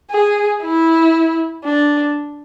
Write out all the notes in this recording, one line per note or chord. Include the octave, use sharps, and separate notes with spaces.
G#4
E4
D4